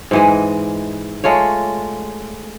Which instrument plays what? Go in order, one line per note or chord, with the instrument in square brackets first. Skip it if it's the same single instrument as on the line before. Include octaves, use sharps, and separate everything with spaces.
[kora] G#2 E3 G#3
G#3 A3 F4 C#5